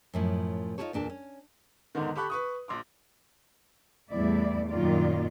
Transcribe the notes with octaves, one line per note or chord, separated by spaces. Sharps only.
F#2 A2 F3
D#4 F4 F#4 G#4 A4 C#5
E2 A#2 D4 A4
C#4
E2 G#2 D3 D#3
G4 A4 B5 C#6 F#6
B4 C#6 D#6
A#1 C6 D6
E2 A2 G3 A3 E4 D5
F#2 A#2 D#3 F#3 F4 D5